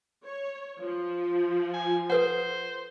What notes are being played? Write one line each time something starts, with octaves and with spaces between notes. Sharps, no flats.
C#5
F3
G#5
A4 B4 C5 F#5